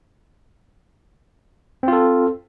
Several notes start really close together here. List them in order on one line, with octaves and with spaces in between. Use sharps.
C4 F4 A4